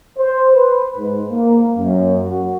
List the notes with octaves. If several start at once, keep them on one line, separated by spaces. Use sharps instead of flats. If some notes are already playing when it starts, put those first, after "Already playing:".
C5
B4
G#2
A#3
F#2
F#4